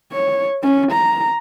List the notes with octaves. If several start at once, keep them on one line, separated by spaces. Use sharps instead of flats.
C#5
C#4
A#5